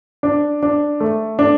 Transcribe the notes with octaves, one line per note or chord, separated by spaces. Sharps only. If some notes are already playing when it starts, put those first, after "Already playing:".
D4
D4
A3
D4